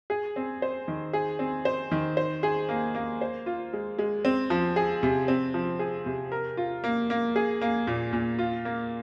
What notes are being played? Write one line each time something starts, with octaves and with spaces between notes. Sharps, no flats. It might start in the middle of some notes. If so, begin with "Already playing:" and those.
G#4
C4
C5
D#3
G#4
C4
C5
D#3
C5
G#4
A#3
A#3
C5
F4
G#3
G#3
C4
F3
G#4
C3
C4
F3
G#4
C3
A#4
F4
A#3
A#3
G#4
A#3
A#2
A#2
F4
A#3